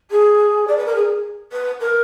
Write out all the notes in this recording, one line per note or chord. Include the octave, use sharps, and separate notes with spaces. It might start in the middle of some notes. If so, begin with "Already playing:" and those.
G#4
D5
B4
A#4
G#4
B4
A#4